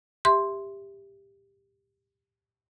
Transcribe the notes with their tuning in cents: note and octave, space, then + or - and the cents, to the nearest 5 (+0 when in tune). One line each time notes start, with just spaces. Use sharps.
G4 +15 E5 +0 C6 +0